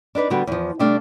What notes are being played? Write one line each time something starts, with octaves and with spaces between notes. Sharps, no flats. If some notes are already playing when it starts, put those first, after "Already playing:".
D4 D#4 B4 D5
D3 G3 B3 F#4
E2 F3
C3 G3 A3 D4 F5